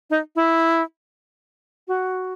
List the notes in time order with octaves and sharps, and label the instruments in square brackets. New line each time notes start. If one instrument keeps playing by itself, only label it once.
[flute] D#4
E4
F#4